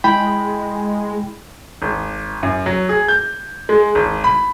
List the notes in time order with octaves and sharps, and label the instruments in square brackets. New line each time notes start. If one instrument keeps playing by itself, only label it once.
[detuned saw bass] G#3 [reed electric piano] E4 G5 B5
[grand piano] G#1
F#2
F#3
G#4
G6
G#3
G#1
B5